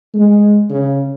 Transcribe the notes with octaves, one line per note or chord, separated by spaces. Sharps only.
G#3
C#3